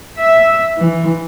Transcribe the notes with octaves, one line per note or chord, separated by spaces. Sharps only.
E5
E3